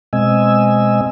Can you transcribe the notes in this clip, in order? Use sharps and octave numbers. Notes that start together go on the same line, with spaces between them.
B2 G#3 C4 D#5 G#5 E6